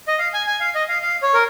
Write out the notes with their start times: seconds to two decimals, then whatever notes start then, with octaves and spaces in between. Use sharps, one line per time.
0.08 D#5
0.19 F5
0.34 G#5
0.47 G#5
0.60 F5
0.75 D#5
0.88 F5
1.02 F5
1.22 C#5
1.34 A#4